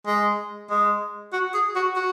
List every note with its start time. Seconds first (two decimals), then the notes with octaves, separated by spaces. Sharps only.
0.07 G#3
0.70 G#3
1.33 F#4
1.54 G#4
1.75 F#4
1.96 F#4